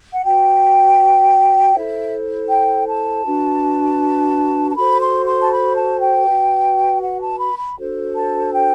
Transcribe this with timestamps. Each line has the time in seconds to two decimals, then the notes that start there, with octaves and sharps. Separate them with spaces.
0.13 F#5
0.23 F#4 B4 G5
1.74 E4 A4 C5 E5
2.50 G5
2.87 A5
3.25 D4 F#4 B4
4.71 A5
4.76 F#4 A4 C5 B5
5.00 C6
5.26 C6
5.41 A5
5.51 B5
5.76 A5
6.01 G5
6.26 F#4 B4
7.02 F#5
7.21 A5
7.39 B5
7.59 B5
7.78 D4 F#4 A4 C5
8.15 A5
8.53 G5